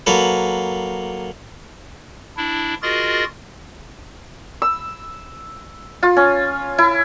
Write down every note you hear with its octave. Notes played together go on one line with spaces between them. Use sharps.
F#3 A#3 A4 B4
D4 E4
F4 F#4 G#4 A#4 D#5 A6
E6
F4
C#4
E4